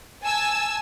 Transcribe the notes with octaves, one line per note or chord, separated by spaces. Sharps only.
G#5 A5 E6